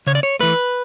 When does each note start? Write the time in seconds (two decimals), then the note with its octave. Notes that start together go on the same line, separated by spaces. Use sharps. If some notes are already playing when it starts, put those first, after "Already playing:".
0.07 C#3 C#5
0.15 D5
0.23 C#5
0.40 E3 A3 B4